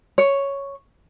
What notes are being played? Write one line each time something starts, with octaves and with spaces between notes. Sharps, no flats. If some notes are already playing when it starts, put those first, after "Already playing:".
C#5